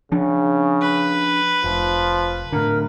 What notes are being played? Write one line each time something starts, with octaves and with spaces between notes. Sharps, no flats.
C#3 F3 D4
B4
F1 F3
A2 D3 A#4